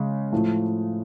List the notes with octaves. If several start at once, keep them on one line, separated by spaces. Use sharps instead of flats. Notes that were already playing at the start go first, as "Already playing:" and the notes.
Already playing: C#3 G#3 C#4
A2 F3 A3